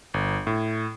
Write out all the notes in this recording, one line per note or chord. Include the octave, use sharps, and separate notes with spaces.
G1
A2